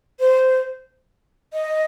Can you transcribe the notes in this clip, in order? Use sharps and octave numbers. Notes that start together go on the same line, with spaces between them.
C5
D#5